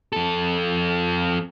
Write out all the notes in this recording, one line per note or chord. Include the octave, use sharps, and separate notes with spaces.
F2 A4